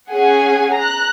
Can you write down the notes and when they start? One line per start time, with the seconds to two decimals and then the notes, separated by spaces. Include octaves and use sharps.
0.11 C#4 G#4 F#5 G#5
0.75 A#5 F#6